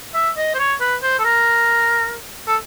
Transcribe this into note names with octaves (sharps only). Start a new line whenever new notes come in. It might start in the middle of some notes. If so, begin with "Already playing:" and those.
E5
D#5
C5
C#5
B4
C5
A4
A#4
A4